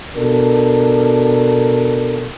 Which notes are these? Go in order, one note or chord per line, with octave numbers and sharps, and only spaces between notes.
B2 D4 A4 A#4